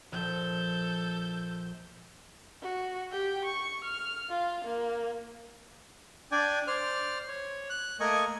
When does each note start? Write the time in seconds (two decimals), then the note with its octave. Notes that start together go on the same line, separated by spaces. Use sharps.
0.12 A#1 A4 G6
2.62 F#4
3.11 G4 G5
3.44 C#6
3.84 F6
4.29 F4 F5
4.65 A#3
6.32 D4 D5 G5 G#5
6.67 C5 D5 F6
7.28 C#5
7.70 F#6
8.00 A3 A#3 A#4 D#5 G#5 C#6